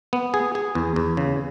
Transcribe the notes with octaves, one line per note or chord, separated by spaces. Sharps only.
B3
G#4
G#4
E2
E2
C#3